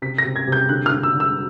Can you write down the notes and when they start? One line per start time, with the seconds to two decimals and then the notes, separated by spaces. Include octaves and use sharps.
0.02 C3 B6
0.18 A#6
0.25 C3
0.36 G#6
0.47 C3
0.52 G6
0.69 D3 F#6
0.86 F6
0.92 D3
1.03 E6
1.14 D3
1.20 E6